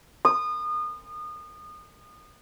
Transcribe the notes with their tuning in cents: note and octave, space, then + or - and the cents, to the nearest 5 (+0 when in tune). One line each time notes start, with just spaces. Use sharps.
D#6 -30